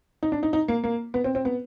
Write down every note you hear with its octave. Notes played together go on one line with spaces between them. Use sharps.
D#4
D4
D#4
D#4
A#3
A#3
B3
C4
C4
B3